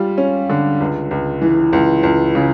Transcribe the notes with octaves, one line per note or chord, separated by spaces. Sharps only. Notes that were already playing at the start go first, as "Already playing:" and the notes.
Already playing: G3 F4
C#4
D3
C#2
C#2
E3
C#2
C#2
C#3